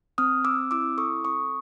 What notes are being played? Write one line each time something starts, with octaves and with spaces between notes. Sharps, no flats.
C4 D#6 F6
C4 D6 E6
E4 D6 E6
A4 C#6 D#6
C4 C#6 D#6